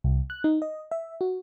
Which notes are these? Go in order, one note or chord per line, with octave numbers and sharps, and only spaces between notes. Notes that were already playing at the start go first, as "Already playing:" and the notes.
C2
F#6
D#4
D#5
E5
F#4